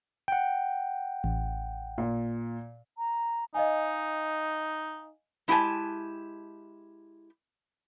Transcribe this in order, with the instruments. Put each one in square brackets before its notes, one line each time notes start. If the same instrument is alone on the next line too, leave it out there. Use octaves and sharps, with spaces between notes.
[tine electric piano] F#5 G5
[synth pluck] A1
[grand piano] A#2
[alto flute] A#5
[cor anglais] D#4 [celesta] D#5 F5 G#5
[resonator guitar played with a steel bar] G#3 E4 G4 F#5 G#5 A5